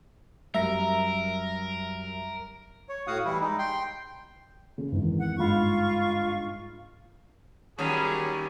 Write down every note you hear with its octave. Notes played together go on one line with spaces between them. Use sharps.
F#2 G3 A#4 E5 A#5
C#5
A2 F#4 F5 F#5 D#6
E3 G3 E4
G#3 D#4
G5 C6
C#3
G#1 E2
F#5
G1 G#2 F4 B5 C#6
D#2 F#3 G3 C#4 F#4 G#4